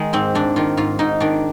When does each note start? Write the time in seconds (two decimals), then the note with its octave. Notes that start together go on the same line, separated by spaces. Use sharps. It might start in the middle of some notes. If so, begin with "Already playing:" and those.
Already playing: D#3 G#3
0.13 G#2 C4
0.35 G#2 D4
0.56 D#3 F4
0.77 G#2 F4
0.99 G#2 D#4
1.20 D#3 D4